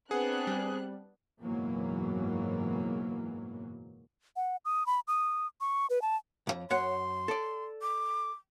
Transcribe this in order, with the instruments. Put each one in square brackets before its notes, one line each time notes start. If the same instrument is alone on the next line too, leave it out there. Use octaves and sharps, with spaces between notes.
[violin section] B3 D4 F#6 [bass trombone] C4 [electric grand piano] G#4 [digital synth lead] F#5
[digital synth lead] G3
[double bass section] F#1 G#2 B2 E3 F#3 A#3
[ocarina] F#5
D#6
B5
D#6
C#6
B4
A5
[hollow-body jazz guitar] B1 F2
[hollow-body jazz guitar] F#2 C#5 F#5 [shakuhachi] C6
[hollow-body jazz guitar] A4 D5
[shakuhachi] D6